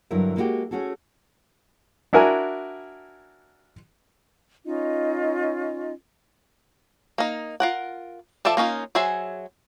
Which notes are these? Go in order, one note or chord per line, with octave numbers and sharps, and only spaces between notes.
G2 D3 F#3 E4 A#4 E5
G#3 A#3 D4 E4 F#4 G4
A3 C#4 F#4 G#4 A4
D4 E4 F#4 A#4 G#5
C#4 D#4 F4 D#5
A#3 D#4
F4 A#4 F#5
F3 A4 D5 E5 A5
A#3 C#4 D#4 F4
F#3 G#4 C5 E5 G#5